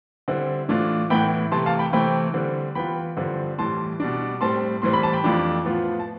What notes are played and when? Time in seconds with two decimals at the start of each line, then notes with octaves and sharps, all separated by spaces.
0.28 D3 G3 C4 E4
0.68 A2 E3 A3 D4 F4
1.10 A2 E3 B3 E4 G5 B5
1.51 C3 E3 A3 A5 C6
1.66 F5 A5
1.79 G5 B5
1.93 C3 E3 A3 C4 G5 B5
2.34 D3 G3 C4
2.75 E3 B3 F4 G5 B5
3.17 G2 D3 F3 C4
3.58 A2 E3 G3 A5 C6
4.00 B2 G3 D4
4.41 A2 G3 C4 A5 C6
4.82 A2 E3 G3 C4 C6
4.93 B5
5.03 A5
5.13 G5 B5
5.24 F2 E3 A3 D4 F4
5.65 A2 F3 B3 F4
5.99 A5